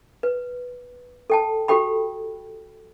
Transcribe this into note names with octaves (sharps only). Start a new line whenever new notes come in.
B4
A4 G5 A5
F#4 G4 A4 G5 B5